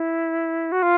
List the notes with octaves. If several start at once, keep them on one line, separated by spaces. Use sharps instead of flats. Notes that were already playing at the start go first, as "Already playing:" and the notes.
Already playing: E4
F#4
F4